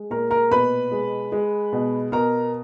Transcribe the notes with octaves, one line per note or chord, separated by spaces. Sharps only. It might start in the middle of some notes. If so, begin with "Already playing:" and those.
Already playing: G#3
A#2 A#4 A#5
A#4 A#5
B2 B4 B5
G#3
G#3
B2
B2 A#4 A#5